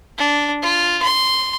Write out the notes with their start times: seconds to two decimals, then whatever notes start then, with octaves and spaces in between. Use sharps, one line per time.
0.18 D4
0.62 F4
1.02 C6